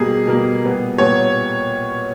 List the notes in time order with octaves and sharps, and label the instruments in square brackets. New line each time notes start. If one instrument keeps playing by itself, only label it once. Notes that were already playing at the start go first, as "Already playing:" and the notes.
Already playing: [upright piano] B2 G3 A#3 G#4
B2 G3 A#3 A#4
A#2 G3 B3
A#2 G3 B3 C#5